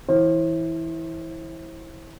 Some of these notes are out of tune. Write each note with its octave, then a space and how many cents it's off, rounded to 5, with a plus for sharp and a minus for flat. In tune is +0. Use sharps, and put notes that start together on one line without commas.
E3 -10 C5 +40